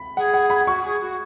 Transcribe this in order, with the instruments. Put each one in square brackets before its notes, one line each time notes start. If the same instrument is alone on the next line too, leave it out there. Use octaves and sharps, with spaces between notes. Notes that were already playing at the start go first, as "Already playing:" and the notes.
Already playing: [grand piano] B5
[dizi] G#4 [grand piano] F#5
[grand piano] F#5
B5
[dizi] F#4 [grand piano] C#6
[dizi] G#4
F#4